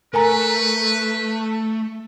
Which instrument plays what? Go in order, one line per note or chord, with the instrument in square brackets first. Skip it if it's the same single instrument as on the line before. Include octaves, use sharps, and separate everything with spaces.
[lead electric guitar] A3 [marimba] A#4 G#5 A#5 [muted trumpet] B4